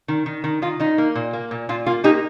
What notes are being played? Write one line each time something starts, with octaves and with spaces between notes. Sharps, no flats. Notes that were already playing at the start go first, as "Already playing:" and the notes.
D#3
D#3
D#3
D#3 F4
D#3 D#4
A#3
A#2
A#3
A#2
A#2 F4
A#3 F4
A#3 D#4 G4